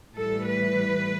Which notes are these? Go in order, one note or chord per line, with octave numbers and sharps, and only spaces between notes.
A2 E3 G3 A4
B4